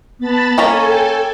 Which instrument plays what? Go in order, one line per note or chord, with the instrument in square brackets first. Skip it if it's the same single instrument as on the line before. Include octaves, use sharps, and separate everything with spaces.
[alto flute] B3 [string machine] A5 B5 A6
[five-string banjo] A#3 C#4 A#5 [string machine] A4 G#5 [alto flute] C#6
[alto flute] G5